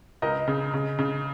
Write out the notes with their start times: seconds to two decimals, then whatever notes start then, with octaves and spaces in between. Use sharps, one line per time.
0.22 C#2 A#4 D#5
0.48 C#3
0.74 C#3
0.99 C#3